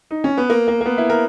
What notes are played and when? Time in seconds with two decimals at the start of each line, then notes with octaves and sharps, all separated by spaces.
0.11 D#4
0.24 C#4
0.38 B3
0.50 A#3
0.68 A#3
0.81 A#3
0.86 B3
0.98 E4
1.10 A#4